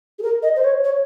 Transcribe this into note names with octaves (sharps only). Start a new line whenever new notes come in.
G#4
A#4
D#5
C5
C#5
C#5